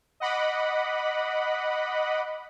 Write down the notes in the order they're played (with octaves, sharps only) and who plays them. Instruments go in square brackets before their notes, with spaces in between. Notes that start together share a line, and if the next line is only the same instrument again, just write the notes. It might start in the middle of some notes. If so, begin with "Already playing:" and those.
[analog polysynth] D#5 F#5 B5 D6